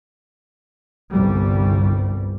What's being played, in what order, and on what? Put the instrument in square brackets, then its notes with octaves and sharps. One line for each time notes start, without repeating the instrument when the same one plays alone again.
[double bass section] G1 C2 G3